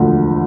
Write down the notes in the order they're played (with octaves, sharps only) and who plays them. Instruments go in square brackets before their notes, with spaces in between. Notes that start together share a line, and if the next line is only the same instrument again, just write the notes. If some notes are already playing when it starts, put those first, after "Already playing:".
Already playing: [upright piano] E1 D2 D3 F3